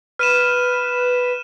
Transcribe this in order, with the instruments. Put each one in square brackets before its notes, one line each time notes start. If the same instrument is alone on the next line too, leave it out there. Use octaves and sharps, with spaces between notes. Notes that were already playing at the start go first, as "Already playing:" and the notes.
[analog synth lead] B4 [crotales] F6 D#7 E7